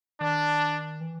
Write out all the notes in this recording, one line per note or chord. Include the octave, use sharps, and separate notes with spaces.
D#3 D4
E3